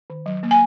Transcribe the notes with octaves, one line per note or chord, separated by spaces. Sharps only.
D#3
F#3
A#3
G#5